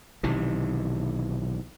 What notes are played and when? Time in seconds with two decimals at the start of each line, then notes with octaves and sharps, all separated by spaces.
0.23 B1 C3 D#3 E3